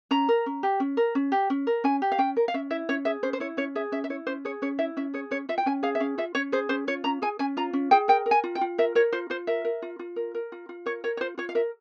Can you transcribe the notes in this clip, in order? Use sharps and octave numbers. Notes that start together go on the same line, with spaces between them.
C#4 A#5
A#4
C#4
G4
C#4
A#4
C#4
G4
C#4
A#4
C#4 G#5
G4
F5
C#4 G5
A#4
F5
C#4 E5
E4 E5
C#4 C#5
G#4 E5
C#4 C5
C5
E4 C#5
C#4 C#5
G#4 E5
C#4 E5
E5
E4 C#5
C#4 C5
G#4 C#5
C#4 C#5
E4 E5
C#4 E5
G#4 C#5
C#4 C#5
F4 E5
G5
C#4 G#5
G#4 F5
E5
C#4 F5
F4 E5
C#4 C#5
G#4 C5
C#4 C5
F4 C#5
C#4 A#5
G#4 G#5
C#4 G#5
F4 A#5
C#4
G#4 G5
A#4 G5
A#4
G#5
F4
G5
F4
A#4 E5
A#4 C#5
F4 C5
F4 C5
A#4 E5
A#4
F4
F4
A#4
A#4
F4
F4
A#4 C#5
A#4 C#5
C#5
F4 C5
F4 C#5
F5
A#4 E5